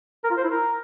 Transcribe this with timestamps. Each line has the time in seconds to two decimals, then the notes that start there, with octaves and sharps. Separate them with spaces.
0.24 A#4
0.31 F4
0.38 C5
0.44 E4
0.51 A#4